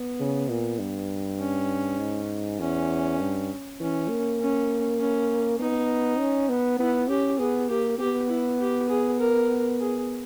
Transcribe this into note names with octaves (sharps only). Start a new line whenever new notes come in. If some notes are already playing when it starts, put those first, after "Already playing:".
Already playing: B3
C#3
A#2
G2
C#4
G#2
E2 C#4
G2
E3 C#4
A#3
C#4
C#4
B3 D#4
C#4
B3
B3 E4
C#4 G4
B3 G#4
A#3 G4
B3 G4
E4
G4
G#4
A#4
G#4